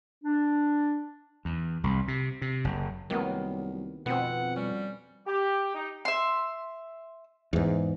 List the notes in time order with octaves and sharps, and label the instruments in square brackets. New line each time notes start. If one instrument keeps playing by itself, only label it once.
[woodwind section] D4
[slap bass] E2
C2
C3
C3
F#1
[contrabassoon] C2 [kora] D#3 A#3 B3 [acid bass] F#3
[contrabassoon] F2 [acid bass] B2 [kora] B3 C4 [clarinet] F#5
[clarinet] G3 [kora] C#4
[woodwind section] G4
D#4
[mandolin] E5 C6
[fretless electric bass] E2 G#2